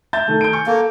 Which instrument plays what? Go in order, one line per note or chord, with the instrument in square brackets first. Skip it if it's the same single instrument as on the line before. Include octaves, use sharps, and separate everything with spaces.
[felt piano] E5 [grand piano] G6 A6
[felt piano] D#3 A3
[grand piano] G6 D7
[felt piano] G#5 C#6
[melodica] A#3 [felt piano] A4